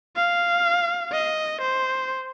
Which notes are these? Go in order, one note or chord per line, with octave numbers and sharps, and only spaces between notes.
F5
D#5
C5